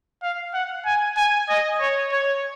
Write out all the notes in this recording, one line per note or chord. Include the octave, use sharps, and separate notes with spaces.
F5
F#5
G#5
G#5
D#5
C#5
C#5